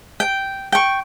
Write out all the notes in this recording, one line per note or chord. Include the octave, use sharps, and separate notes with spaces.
G5
G5 C#6